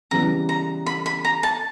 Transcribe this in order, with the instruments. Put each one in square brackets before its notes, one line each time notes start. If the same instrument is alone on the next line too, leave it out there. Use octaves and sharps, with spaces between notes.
[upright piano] C#3 E3 G3 B3 [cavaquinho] A#5
[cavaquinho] A#5
B5
B5
A#5
A5